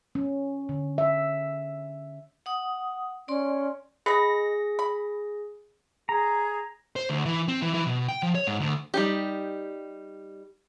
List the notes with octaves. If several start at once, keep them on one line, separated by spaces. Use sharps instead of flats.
C#4
D3
E5
F#5 D#6
C#4 D5 C6
G#4 B4 D#5 B5 A#6
B5
G#4 A#5
C5
D2
E3
C4
E3
E3
B2
G5
F3
C#5
G#2
D2
G3 D#4 G4